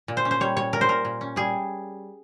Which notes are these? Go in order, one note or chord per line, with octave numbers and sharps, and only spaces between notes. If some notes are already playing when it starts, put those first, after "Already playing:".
A#2
C5
C#4
C5
G3 C#5
A#2 C#5
A#2 A#4
C5
A#2 A#4
A#2
C#4
G3 G#4